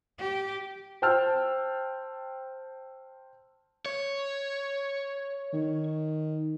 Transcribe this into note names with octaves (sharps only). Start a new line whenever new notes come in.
G4
C5 G5 A5 E6 F6
C#5
D#3